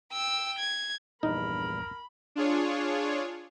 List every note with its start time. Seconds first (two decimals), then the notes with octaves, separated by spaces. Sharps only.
0.13 G5 E6
0.59 G#6
1.23 A#1 E2 G2 D#4 A#4 B5
2.35 D4 F4 G#4 C#5